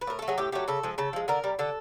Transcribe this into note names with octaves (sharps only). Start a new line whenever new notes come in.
B4
A2 A#4
A3 A4
F#3 G#4
A2 G4
F#3 A3 G4
C#3 A4
F3 G#3
C#3 A4
F3 G#3
D3 A#4
G3
D3 A4